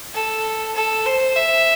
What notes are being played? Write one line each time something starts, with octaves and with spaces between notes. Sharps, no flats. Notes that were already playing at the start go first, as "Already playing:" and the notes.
A4
A4
C5
E5